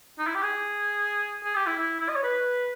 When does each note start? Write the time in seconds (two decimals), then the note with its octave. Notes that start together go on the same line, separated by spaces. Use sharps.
0.19 D#4
0.27 E4
0.35 G4
0.43 G#4
1.44 G#4
1.56 G4
1.67 E4
1.78 E4
2.00 E4
2.09 D#5
2.16 C#5
2.23 B4